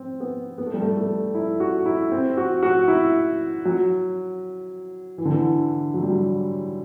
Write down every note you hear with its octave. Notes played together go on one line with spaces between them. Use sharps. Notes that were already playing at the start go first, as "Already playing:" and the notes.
Already playing: C4
B3
B3
A3
G3
A3
A3
E4
F#4
E4
C4
F#4
F#4
E4
F#3
E3
D3
E3
F#3
G3
F#3